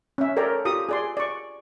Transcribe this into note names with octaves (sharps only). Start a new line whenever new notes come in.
C#4 E5
A4 A#4 C#5 D5 G5 A#5
F4 G4 D#6
G#4 D5 C6
D5 C#6